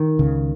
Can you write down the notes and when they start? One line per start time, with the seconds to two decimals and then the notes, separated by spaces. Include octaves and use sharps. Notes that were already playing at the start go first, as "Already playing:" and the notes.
Already playing: D#3
0.19 C#2 C#3